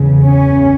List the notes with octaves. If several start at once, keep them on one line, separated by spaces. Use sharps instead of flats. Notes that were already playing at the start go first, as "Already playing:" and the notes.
Already playing: E2 C#3
C#4